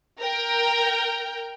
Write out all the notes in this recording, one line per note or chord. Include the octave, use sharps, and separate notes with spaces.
A#4 G5